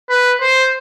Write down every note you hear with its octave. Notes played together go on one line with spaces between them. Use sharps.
B4
C5